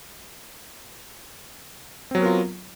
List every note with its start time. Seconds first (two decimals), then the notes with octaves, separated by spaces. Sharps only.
2.11 C4
2.15 F#3
2.18 B3
2.22 A#4
2.26 F4